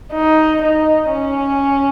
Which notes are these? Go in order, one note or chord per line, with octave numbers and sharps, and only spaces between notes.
D#4
D#4
C#4